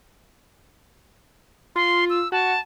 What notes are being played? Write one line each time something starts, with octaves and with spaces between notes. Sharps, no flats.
F4 C6
E6
F#4 A5